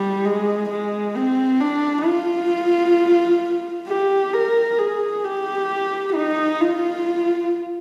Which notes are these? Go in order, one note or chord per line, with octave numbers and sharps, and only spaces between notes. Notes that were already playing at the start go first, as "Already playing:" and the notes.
Already playing: G3
G#3
G#3
C4
D4
F4
G4
A#4
G#4
G4
D#4
F4